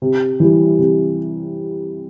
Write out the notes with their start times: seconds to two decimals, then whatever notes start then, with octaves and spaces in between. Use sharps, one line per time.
0.02 C3
0.40 E3 G3
0.79 C3